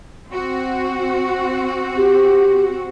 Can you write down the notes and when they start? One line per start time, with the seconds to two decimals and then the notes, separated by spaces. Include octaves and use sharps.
0.28 C4 F#4
1.97 G4